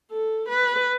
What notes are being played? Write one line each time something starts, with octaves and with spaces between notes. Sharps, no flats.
A4
B4